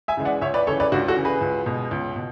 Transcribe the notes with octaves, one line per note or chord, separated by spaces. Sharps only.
E5 G#5
C#3 E3 G#3
D5 F#5
C#2 C#5 E5
B4 D5
C#3 E3 A4 C#5
B4 D5
C#2 D4 F#4
F#4 A4
C#3 E3
G#4 B4
C#2
B2 G#3
C#2
B2